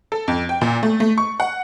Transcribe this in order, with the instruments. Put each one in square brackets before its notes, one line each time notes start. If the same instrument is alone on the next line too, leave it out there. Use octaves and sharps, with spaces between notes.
[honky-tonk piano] A4
F2
G5
A#2
A3
A3
C#6
F#5